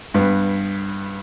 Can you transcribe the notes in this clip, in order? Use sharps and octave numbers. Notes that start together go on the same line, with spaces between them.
G2 B3